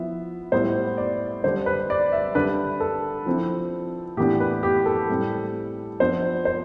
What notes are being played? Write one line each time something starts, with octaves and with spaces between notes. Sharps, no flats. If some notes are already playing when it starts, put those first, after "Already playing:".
Already playing: F3 B3 E4 E5
A2 G3 B3 E4 C5
D5
D3 G3 D4 C5
B4
D5
E5
D3 G3 D4 B4
A4
F3 C4 E4
A2 E3 B3 D4 G4
B4
G4
A4
A2 G3 C4
F3 B3 D4 C5
C5